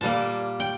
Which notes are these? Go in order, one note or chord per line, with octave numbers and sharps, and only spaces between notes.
A#2 G3 A#3 A5
G5